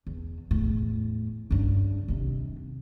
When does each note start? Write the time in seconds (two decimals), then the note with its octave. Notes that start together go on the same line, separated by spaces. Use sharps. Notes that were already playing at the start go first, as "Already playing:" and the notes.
0.07 E2
0.51 E2 A2
1.51 G2 C#3
2.08 D#2 C3